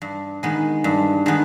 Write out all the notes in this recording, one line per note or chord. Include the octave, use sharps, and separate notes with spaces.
G2
D#3 G#3 B3
G2
D#3 G#3 B3